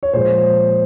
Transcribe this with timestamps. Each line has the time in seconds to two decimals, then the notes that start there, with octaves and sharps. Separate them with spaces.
0.03 C#5
0.13 A#2 F3 G#3 C5